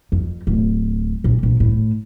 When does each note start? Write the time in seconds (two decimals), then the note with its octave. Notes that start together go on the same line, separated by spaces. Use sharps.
0.12 F2
0.47 D1
1.24 A#1
1.43 A#1
1.60 A2